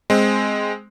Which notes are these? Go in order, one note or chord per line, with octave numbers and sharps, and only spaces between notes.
G#3 C4